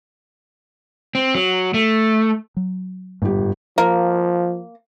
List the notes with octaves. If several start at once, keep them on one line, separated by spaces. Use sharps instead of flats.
C4
F#3
A3
F#3
G1 G#2 G4
G#2
F3 A#3